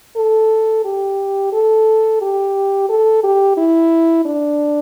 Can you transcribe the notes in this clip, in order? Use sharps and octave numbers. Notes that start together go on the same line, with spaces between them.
A4
G4
A4
G4
A4
G4
E4
D4